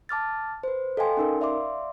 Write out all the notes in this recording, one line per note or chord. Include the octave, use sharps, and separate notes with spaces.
A5 D6 F6 A6
B4 C5
A4 D#5 F5 G5 G#5 C6
C#4 D#4 A#4
D5 E5 F5 C6 D6